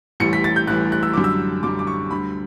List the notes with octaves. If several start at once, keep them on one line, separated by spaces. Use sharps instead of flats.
A1 A2 E3 G3 C#7
B6
A6
G6
A1 A2 E3 G3 F#6
F#6
E6
F#2 D3 G3 D6
E6
F#2 D3 G3 D6
D6
C#6
D2 D3 G3 B5